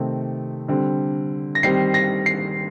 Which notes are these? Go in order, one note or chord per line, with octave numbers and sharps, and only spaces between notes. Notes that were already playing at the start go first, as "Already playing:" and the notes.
Already playing: C3 D#3 A3 C4
D3 G3 C4
A#6
D#3 G3 C4 C7
A#6
C7